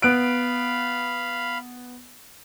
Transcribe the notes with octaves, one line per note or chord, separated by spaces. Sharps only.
B3 F5 B5 F#6 D7